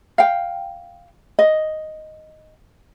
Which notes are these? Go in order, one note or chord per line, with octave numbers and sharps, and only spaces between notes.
F5 G5
D#5